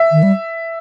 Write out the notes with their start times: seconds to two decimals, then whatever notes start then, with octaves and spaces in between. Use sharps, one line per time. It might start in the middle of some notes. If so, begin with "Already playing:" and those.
Already playing: E5
0.12 D#3
0.23 G3